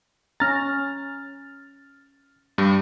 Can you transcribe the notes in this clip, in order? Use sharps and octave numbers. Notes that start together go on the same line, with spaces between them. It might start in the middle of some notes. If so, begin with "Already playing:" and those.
C#4 A#5 F6 A6
G2 G3